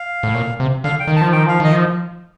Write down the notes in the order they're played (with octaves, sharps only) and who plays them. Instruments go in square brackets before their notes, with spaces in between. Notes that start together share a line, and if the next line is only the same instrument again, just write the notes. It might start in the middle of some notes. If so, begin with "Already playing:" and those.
Already playing: [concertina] F5
[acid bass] A2
A#2
C3
[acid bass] D3 [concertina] F5
[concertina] G5
[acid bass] D#3
[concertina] A5
[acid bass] F3
[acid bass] D#3 [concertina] G5
[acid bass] F3 [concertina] F5
[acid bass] D#3 [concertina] D#5
[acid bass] F3